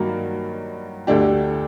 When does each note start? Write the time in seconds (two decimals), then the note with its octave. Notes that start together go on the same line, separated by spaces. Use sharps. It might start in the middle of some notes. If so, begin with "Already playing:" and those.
Already playing: G2 D#3 F#3 A#3 F#4
1.07 D2 D3 A3 D4 G4